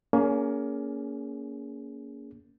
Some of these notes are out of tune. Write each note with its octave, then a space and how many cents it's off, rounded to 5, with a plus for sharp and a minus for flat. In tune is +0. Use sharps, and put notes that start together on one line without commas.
A#3 +0 C#4 +30 G#4 +10